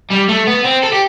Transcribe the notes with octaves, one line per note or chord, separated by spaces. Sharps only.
G3
A3
B3
C4
A4
G4